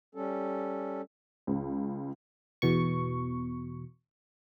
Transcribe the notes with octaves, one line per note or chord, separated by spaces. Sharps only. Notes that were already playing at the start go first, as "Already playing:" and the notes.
G3 C#4 A4
C#2
E2 B2 C#6